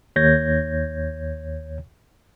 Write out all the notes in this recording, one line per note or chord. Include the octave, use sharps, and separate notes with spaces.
D#2 C#5 G6 G#6 A#6